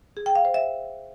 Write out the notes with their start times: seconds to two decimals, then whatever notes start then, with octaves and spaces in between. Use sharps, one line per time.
0.17 G#4
0.26 G5
0.36 F5
0.45 C5
0.54 E5